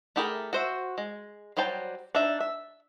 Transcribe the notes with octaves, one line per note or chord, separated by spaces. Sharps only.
A3 E4 G4 G#4 A#4
F#4 C5 E5
G#3
F#3 G3 C5 G5 A5
D4 D#4 E5
E5